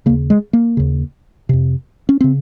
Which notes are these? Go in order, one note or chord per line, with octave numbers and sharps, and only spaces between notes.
D#2 C#3 A#3
G#3
A#3
D#2 C#3
F2 C3
C#4
C#3 C4